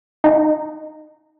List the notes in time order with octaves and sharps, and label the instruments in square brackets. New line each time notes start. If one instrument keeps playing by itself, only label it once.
[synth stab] D#4